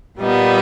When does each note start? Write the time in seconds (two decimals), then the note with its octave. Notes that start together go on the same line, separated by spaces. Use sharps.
0.18 A#2 G3 B3 D#4